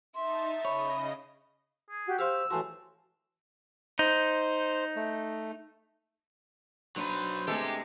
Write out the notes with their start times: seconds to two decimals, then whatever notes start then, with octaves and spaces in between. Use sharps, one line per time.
0.15 D#4 E5 A5 C6
0.65 C#3 C#5 D#5 B5
1.90 G#4
2.06 F#4 G4
2.19 G4 C5 F5 C#6 E6
2.51 A2 E3 F#4 G#5 A5 C6
3.99 D#4 C5
4.96 A3
6.96 F#3 D4 D#4 B4 C5
7.48 C3 G#3 A3 B3 D4 G4 A4